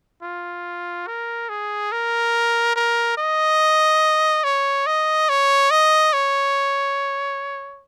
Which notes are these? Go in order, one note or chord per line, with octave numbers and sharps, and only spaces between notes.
F4
A#4
G#4
A#4
A#4
D#5
C#5
D#5
C#5
D#5
C#5